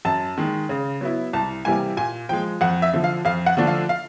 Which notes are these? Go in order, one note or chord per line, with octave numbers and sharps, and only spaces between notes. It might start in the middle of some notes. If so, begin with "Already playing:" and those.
F#2 A5
D#3 G#3
C#3
F#3 B3 E4
C2 A5
C3 E3 G3 A#3 G#5
A#2 G#5
F3 G#3 G5
F2 F#5
E5
D3 F3
F5
F2 F5
F#5
D3 F3 A3 D4
F5
F5